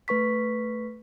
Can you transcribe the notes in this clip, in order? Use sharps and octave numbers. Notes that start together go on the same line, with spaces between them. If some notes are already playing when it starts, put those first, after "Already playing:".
A3 B4 C#6 B6